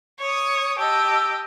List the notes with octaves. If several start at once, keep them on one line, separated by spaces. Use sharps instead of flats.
C#5 D#6
G4 D#5 A5 E6